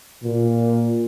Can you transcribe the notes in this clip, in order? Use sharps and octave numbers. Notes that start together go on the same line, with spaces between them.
A#2